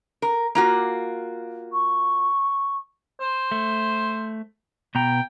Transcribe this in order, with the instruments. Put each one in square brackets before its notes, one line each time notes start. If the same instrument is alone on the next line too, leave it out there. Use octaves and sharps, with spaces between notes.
[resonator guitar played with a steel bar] A#4
A#3 F4 F#4
[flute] C#6
[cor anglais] C5
[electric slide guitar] A3
[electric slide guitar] B2 B3 A#5 [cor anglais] G5